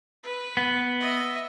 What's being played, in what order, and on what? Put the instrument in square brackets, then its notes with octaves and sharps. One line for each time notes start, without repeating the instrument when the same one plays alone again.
[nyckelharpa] B4
[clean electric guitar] B3
[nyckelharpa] D#5 E5